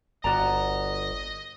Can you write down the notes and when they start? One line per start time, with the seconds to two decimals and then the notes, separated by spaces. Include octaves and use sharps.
0.24 G1 F#4 D5 D#5 A#5